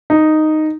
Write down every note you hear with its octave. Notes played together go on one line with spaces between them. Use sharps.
D#4